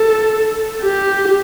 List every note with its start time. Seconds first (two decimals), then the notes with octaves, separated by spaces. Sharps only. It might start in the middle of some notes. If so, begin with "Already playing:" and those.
Already playing: A4
0.83 G4